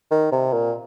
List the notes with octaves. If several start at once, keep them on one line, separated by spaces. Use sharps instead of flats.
D#3
C3
A#2